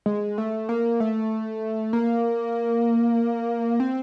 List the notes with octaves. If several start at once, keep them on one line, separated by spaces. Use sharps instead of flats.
G#3
A3
A#3
A3
A#3
C4